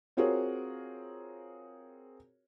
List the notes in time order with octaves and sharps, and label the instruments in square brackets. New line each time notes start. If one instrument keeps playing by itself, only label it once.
[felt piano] C4 F4 F#4 G#4 A#4 C#5